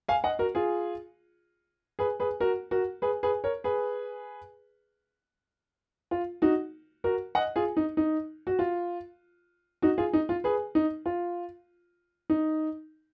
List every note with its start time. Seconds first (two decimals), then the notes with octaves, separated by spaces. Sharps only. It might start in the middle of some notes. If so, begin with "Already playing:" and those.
0.09 F5 G#5
0.24 D#5 F#5
0.39 F#4 A#4
0.55 F4 G#4
1.99 G#4 B4
2.20 G#4 B4
2.40 F#4 A#4
2.71 F#4 A#4
3.02 G#4 B4
3.23 G#4 B4
3.44 A#4 C#5
3.64 G#4 B4
6.11 F4
6.42 D#4 F#4
7.04 F#4 A#4
7.35 D#5 F#5
7.56 F4 G#4
7.77 D#4
7.97 D#4
8.47 F#4
8.59 F4
9.82 D#4 F#4
9.98 F4 G#4
10.13 D#4
10.29 F4
10.44 G#4 B4
10.75 D#4
11.06 F4
12.30 D#4